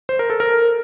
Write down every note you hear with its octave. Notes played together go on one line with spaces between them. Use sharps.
C5
A#4
A4
A#4